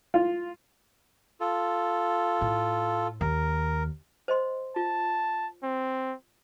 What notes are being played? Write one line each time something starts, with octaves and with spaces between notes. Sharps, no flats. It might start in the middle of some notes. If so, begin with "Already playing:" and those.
F4
F4 A4
A2
D#2 A#4
C5 D#5 C6
F4 A5
C4